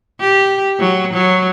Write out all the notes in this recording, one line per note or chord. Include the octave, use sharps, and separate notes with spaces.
G4
F#3
F#3